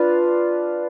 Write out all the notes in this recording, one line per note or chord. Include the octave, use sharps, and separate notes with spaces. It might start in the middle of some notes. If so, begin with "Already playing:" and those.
Already playing: D4 F4 B4 F5